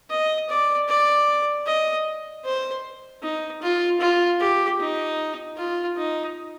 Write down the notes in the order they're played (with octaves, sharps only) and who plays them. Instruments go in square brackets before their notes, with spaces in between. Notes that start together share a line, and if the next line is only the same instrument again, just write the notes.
[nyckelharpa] D#5
D5
D5
D#5
C5
D#4
F4
F4
G4
D#4
F4
D#4